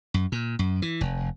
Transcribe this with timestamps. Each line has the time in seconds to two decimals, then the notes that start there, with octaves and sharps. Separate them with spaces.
0.14 F#2
0.32 A#2
0.59 F#2
0.82 E3
1.01 F1